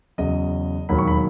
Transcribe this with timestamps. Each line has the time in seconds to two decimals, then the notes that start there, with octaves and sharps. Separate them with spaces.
0.18 E2 C#3 F#3 D#5
0.89 E1 D#2 D#3 F#3 B5
0.98 C#6
1.08 B5